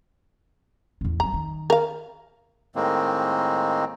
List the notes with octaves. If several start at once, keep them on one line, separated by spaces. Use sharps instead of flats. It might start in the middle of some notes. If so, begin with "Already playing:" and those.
E2 A2
D3 F#3 A#5
D#3
A#4 F5
A2 D#3 G#3 A#3 C4